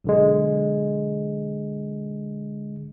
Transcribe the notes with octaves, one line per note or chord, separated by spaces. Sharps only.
B1 D3 G#3